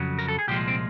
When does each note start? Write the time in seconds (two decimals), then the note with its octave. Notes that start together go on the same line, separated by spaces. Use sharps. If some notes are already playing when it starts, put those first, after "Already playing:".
Already playing: F2 C#3 F#3
0.19 A#4
0.28 A4
0.39 G#4
0.48 C2 A#2 F3 G#3 G4
0.68 C4